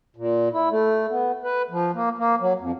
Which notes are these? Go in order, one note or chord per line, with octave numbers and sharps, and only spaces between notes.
A#2
E4
A3
B3
B4
F3
A#3
A#3
F#3
F2